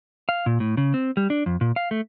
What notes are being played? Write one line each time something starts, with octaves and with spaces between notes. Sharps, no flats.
F5
A#2
A2
C#3
C4
G3
D4
F2
A#2
F5
A3